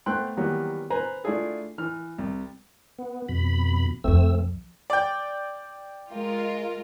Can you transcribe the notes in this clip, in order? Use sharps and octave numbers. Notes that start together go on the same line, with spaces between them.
A3 B3 C5 G5 C6 F#6
D#3 E3 F#3 G3 A#3 B3
B4 C5 G#5 A#5 B5
A3 D4 E4 F4 G#4 A4
E3 F6
C2
B3
F2 B2 B5
B1 F2 A3 C4 E6
D5 G5
G#3 F4 A#4